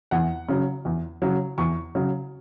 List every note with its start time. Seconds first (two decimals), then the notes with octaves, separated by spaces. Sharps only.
0.11 E2 F#5
0.49 C#3 F#3
0.85 E2
1.22 C#3 F#3
1.58 E2 C#6
1.95 C#3 F#3